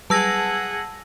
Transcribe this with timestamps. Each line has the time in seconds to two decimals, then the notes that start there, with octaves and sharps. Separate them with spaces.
0.10 F#3 G3 G#4 B4 F#5 A5 E6 A#6